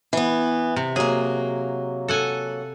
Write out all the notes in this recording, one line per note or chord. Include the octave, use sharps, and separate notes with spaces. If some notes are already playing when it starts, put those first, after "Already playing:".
E3 B3
C3
F#3 A#3 G#4
A4 F#5 G#5